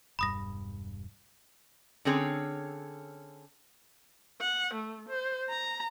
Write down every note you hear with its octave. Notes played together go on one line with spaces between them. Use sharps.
E1 G2 B5 D#6 A#6
D3 C4 C#4 G#4 C#5
F#5
A3
C5
A#5